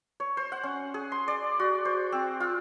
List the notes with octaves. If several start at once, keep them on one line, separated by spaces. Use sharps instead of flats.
C#5
C5
F#5
C#4
G#4
C6
D5
F#4
C5
C4
F4